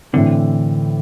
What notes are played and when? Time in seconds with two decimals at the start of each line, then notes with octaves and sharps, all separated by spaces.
0.13 A2 D3 E3 C4